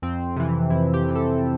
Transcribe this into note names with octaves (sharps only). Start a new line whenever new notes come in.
F2 C4
C3 E3
F2 E4
G4
C3 E3
A4